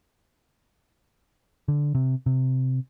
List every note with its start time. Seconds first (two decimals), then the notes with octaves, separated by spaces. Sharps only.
1.68 D3
1.95 C3
2.26 C3